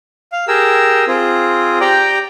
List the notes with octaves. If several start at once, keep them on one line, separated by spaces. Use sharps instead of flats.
F5
G4 G#4 A#4 E6
C4 F4 G#4
G4 D5 G5 A#5